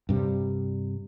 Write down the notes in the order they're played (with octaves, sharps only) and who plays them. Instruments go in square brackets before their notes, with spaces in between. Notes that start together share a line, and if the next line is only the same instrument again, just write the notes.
[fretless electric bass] G2 C3 G3